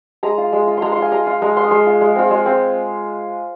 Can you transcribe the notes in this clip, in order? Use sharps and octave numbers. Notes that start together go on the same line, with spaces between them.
G#3 A#5
F4
G#3
F4
G#3 A#5 C6
C6
F4 G#5
G#3 A#5
F4
G#3 A#5
F4 C6
D#6
G#3 C6
F4
G#3
C4 F4
G#3
C4 F4